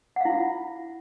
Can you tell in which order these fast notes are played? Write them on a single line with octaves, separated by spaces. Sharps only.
F#5 F5 E4 F4